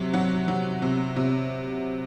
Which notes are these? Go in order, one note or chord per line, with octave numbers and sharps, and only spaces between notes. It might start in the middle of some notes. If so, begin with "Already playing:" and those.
Already playing: C3 F#3
F#3 F#5
F#3
C3
C3